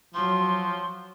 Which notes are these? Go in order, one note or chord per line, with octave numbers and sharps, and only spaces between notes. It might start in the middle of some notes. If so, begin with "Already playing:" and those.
F3 F#3 C6